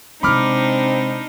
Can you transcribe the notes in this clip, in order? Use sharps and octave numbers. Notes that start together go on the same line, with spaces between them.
C3 G#3 C4 D4 D#4 B5 D6 F6